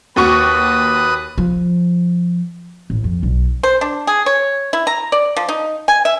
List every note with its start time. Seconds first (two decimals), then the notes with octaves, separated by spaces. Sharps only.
0.16 D#2 F#4 B4 C#6 D#6
1.38 F3
2.90 A1
3.04 F2
3.23 B1
3.63 C5
3.81 D4
4.07 G#4
4.26 C#5
4.73 E4
4.87 A#5
5.12 D5
5.37 F3
5.49 D#4
5.88 G#5
6.05 E5